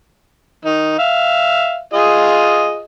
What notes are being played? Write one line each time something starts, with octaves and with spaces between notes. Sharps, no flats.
D#3 D#4
E5 F5
F4 G#4 D#5